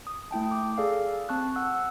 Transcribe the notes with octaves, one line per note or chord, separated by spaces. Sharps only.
D#6
A3 E4 G5 A5
D6
G#4 A4 D5 F5
C4 A5 C#6 F#6
F#5 E6 F#6